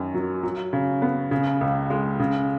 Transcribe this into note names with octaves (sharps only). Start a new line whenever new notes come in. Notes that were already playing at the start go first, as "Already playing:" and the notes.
Already playing: F#2 D#3
F#3
F#3
C#3
B3
C#3
C#2
G#3
C#3